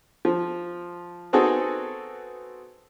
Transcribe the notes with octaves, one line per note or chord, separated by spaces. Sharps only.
F3
B3 C4 D#4 F#4 G#4 A4